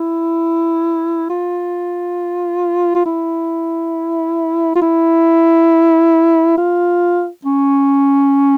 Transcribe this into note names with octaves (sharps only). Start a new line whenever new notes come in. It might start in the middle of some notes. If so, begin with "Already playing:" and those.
Already playing: E4
F4
F4
E4
F4
E4
F4
C#4